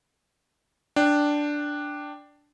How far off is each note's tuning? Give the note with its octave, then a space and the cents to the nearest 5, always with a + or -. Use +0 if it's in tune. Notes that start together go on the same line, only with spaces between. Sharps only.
D4 +0 G5 +0